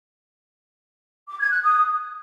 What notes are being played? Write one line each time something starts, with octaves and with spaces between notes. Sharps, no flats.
D6
G#6
F#6
D#6